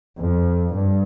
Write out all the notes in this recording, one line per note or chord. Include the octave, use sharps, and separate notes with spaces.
F2
G2